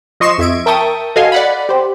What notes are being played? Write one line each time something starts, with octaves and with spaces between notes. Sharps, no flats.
F3 D#5 C6 C#6 C7 E7
F2 E5 G#6 D7
A#4 E5 G5 A5 C#6 D#6
F#4 A4 D#5 F5 G#5 C6
D5 F#5 B5
G4 C5